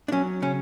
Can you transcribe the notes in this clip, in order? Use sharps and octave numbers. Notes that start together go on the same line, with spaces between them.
D4
F#3 C#4
C#3 C#4